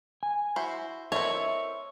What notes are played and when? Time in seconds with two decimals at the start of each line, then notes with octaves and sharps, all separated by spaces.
0.23 G#5
0.56 E4 F#4 C5
1.12 C4 E4 A4 A#4 C#5 D#5 E5